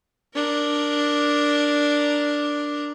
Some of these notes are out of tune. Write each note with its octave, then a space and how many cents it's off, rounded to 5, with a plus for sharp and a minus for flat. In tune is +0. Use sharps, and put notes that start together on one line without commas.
D4 +0 A#4 +0